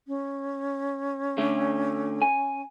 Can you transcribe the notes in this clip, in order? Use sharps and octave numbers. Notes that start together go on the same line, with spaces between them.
C#4
D3 A3
G#5